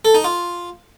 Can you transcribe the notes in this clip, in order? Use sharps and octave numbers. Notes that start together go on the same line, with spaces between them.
A4
D#4
F4